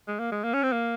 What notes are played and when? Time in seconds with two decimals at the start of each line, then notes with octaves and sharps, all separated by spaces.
0.08 G#3
0.19 A#3
0.32 G#3
0.44 A#3
0.53 C#4
0.63 C4
0.72 A#3